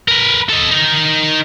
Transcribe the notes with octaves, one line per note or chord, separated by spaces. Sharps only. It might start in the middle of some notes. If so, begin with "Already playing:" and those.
A#4 B4
A4 D#5
D#4 A#4